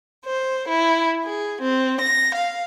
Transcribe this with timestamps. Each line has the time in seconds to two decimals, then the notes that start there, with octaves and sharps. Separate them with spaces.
0.25 C5
0.68 E4
1.24 G#4
1.60 C4
2.01 A#6
2.35 F5